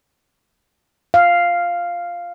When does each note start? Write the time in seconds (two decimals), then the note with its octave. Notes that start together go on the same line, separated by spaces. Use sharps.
1.14 F5